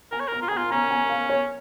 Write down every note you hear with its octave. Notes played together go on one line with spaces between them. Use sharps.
A#4 G#5
C#5
A#4 A#5
F4
G#4
G#5
F4
C#4 A#5
G#5
F5
C#5